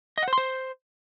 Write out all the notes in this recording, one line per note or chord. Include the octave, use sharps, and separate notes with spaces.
D#5
F#5
C5
C6
C5